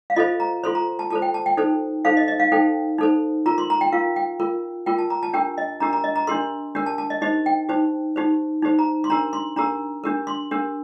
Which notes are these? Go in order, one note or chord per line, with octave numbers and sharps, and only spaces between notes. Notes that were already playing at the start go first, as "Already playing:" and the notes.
F5
F4 A4 C5 D#5
A#5
F4 A4 C5 C6
A#5
A5
F4 A4 C5 A5
G5
A5
G5
D#4 A4 C5
D#4 A4 C5 F5
D#5
D#5
F5
D#4 A4 C5 G5
D#4 A4 C5
F4 A#4 A#5
C6
A#5
G5
F4 A#4 F5
G5
F4 A#4
F4 A#4 G5
A5
A#5
A5
D4 G4 A#4 G5
D#5
D4 G4 A#4 A#5
A#5
D#5
A#5
D4 G4 A#4 C6
D4 G4 A#4
A5
A5
D#5
D#4 G4 C5 D#5
G5
D#4 G4 C5
D#4 G4 C5
D#4 G4 C5
A#5
C6
D4 G4 A#4 A#5
C6
D4 G4 A#4 A#5
D4 G4 A#4
C6
D4 G4 A#4